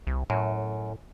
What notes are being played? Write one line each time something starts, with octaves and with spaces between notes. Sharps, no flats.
C2
F#2 A2